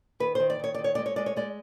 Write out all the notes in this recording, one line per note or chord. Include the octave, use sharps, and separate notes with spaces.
D#3 B4
D#3 C5
D5
D#3 C#5
D#3 D5
C#5
G#3 D5
C#5
G#3 D5
C#5
G#3 D5